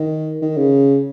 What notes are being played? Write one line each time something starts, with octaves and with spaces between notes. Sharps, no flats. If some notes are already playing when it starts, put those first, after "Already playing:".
Already playing: D#3
D#3
C#3